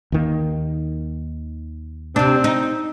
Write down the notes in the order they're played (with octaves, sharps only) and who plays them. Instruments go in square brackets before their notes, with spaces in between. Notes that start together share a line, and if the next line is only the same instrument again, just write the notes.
[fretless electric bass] D#2 D#3 A#3
[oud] C3 D4 [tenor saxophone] C4
[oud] D#4